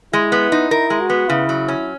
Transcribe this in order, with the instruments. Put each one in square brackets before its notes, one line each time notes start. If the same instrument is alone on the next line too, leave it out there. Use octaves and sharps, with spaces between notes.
[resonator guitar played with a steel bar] G#3 [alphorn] E4
[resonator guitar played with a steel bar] B3
D#4
[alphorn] E4 [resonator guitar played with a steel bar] A#4
[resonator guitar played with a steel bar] G#3
[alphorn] F#4
[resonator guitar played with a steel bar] B3
[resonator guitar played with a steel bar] C#3 [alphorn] E4
[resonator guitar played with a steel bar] F#3
C#4